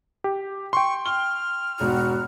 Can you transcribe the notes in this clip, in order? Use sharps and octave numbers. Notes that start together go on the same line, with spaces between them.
G4
G5 C6 C#6
F6 G7
E1 G#2 F#4